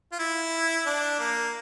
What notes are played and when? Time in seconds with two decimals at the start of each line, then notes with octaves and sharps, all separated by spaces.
0.12 F4
0.19 E4
0.86 D4
1.20 A#3